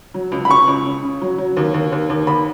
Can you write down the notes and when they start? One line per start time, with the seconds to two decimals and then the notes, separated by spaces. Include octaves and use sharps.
0.14 F#3
0.32 C#2
0.45 B5
0.49 C#3 C#6
0.67 C#2
0.86 C#3
1.03 C#3
1.22 F#3
1.38 F#3
1.57 D#2
1.74 D#2
1.92 D#2
2.09 D#2
2.27 D#2 B5